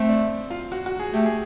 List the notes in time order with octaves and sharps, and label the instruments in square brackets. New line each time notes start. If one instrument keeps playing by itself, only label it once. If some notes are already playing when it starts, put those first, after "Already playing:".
Already playing: [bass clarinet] A3 [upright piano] C4
[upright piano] D4
F4
F#4
F#4
G#4
[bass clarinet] A3 [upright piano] G4
[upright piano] G#4